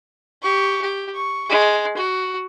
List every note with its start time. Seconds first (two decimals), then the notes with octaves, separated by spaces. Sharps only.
0.42 G4 C#6
0.81 G4
1.14 C#6
1.50 G#3
1.97 F#4